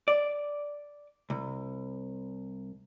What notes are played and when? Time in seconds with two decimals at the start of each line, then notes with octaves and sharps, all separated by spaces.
0.08 D5
1.30 C2